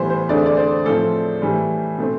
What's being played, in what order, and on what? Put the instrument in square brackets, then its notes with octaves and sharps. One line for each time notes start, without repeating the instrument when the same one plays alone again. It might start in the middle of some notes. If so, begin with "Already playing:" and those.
Already playing: [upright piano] A2 E3 G3 B3 C5
C5
E2 D3 A3 C4 D5
D5
C5
A2 F3 C4 A4
A2 E3 G3
B2 A3 C4